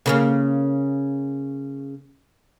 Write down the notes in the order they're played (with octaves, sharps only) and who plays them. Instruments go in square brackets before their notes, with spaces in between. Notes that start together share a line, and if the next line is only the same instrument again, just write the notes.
[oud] C#3 A#3 C#4